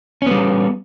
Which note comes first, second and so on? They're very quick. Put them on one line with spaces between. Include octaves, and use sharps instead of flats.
C#4 B3 G3